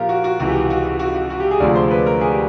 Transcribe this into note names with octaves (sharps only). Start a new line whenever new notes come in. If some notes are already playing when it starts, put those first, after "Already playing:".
Already playing: A#2 F3 A#3 F4 G4 A#4
F#4
F#4
C#2 C3 E3 F#4
G4
F#4
F#4
F#4
F#4
F#4
F#4
G4
G#4
D2 C3 F3 G#3 D5
C5
B4
A#4
G#4
G4